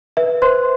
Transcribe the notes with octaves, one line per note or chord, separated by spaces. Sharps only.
B4 E5
B4 C5 C6